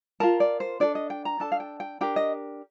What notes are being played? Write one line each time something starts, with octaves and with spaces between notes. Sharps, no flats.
F4 A#4 A5
D5
C5
D4 A4 D5
D#5
G5
A#5
D4 A4 A5
F5
G5
G5
D4 G4 A#4 G5
D#5